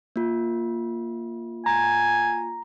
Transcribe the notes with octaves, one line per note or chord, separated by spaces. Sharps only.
A#3 F4
G#5 A#5